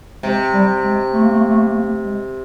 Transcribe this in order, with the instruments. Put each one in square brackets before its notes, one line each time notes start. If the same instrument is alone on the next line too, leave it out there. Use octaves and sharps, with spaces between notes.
[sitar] C3 [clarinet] G#3
[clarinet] G3
G#3
A3
A#3
A3
A#3
A3
A#3
A3
A#3
A3
G#3